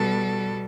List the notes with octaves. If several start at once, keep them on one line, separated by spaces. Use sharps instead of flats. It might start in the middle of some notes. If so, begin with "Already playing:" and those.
Already playing: B2 G3 B3 A4